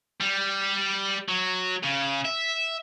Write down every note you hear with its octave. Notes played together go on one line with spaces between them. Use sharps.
G3
F#3
C#3
E5